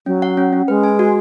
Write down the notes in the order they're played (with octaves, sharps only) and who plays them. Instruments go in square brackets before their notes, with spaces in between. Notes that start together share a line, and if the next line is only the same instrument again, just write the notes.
[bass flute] F#3 [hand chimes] C#4
[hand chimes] F#5
C#4
C#4
[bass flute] G#3 [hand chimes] B4
[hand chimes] G#5
F#4